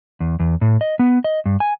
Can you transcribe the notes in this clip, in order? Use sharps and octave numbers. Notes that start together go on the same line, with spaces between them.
E2
E2
A2
D#5
B3
D#5
G2
G#5